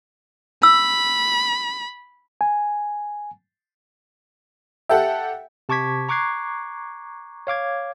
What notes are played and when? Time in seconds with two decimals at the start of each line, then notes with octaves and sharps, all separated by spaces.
0.63 B5 E6
2.41 G#5
4.89 G4 A4 E5 F#5 G5
5.69 C3 A5 C#6 D6 G#6 B6
6.09 A#5 C#6 D6 F#6 G#6 C7
7.47 C#5 F5 D6 G#6